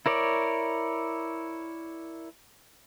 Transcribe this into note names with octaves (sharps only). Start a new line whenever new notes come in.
E4 A#4 C#5 D5